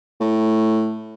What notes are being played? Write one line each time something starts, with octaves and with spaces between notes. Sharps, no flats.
A2